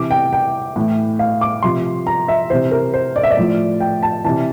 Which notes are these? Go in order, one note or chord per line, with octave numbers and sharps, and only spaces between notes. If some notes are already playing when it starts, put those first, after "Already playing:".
Already playing: C3 E3 D6
G5
G5
A2 E3
F5
D6
C3 F3 C6
A#5
E5
C3 E3 C5
A#4
C5
D5
E5
D5
A2 F3
G5
A5
C3 E3 A5